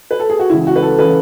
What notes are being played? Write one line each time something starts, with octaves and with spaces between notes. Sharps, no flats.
B4
A4
G#4
F#4
C#2 C#3 E3 E4
F#4
B4
A4
C#3 E3 B4